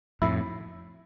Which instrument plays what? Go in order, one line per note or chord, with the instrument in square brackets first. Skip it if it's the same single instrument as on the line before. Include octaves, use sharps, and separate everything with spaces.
[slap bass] F2 A2 [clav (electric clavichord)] E4